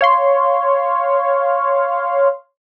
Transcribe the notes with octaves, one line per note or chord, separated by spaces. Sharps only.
C#5 F5 C6